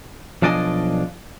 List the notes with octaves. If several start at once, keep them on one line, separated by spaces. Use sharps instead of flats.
B1 F3 D4 D5 D#5 G#5